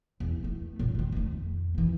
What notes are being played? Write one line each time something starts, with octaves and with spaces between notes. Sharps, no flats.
E2
E2 A3
F#2 A#2
D#3 G#3
F2 A3
D#2 E3